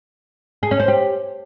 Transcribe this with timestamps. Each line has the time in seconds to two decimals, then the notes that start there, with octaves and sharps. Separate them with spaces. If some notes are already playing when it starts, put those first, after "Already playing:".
0.63 G#4
0.71 C#4
0.80 C5
0.88 G4